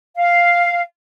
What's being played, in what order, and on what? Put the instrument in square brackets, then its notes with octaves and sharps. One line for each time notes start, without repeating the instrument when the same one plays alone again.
[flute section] F5